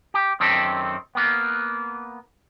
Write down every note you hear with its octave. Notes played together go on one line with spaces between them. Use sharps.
G4
F#2 D#3 C4 G4 A4
A#3 B3